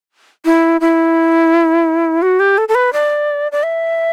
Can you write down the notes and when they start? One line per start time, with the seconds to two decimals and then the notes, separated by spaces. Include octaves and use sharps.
0.45 E4
0.81 E4
2.22 F#4
2.40 G4
2.58 A4
2.68 A4
2.75 B4
2.93 D5
3.52 D5
3.63 E5